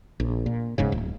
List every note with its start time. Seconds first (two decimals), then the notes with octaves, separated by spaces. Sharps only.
0.20 A#1
0.46 A#2
0.78 E1 G#2 C#3
0.92 D1